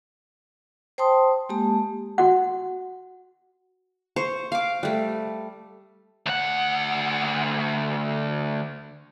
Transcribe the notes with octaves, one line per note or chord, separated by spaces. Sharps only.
C5 G5 A5 C6 D#6
G#3 A#3 G4 A5
F#4 F#5
C5 C#6
F5 D6
G3 A3
D2 F#5